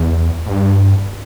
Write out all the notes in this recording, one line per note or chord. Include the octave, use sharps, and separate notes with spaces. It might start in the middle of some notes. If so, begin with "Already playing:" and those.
Already playing: E2
A2
G2